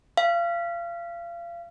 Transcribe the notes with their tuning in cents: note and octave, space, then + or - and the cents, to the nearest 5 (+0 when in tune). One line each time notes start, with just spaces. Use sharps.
F5 -30